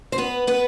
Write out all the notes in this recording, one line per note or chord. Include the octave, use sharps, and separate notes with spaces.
C5
B3 B4
B3 B4